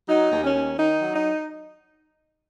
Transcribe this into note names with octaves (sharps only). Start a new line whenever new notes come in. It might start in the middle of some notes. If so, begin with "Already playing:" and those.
F#3 D#4
D#2
C#4
D#2
D#3 D#4
F#3
D#4